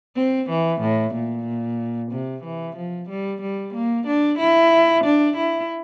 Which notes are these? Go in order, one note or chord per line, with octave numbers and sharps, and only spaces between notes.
C4
E3
A2
A#2
C3
E3
F3
G3
G3
A#3
D4
E4
D4
E4